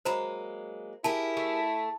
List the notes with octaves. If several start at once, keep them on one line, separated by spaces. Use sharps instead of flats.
F#3 G#3 A#3 C5 A#5 B5
E4 G4 G#4 A#4 A5
A3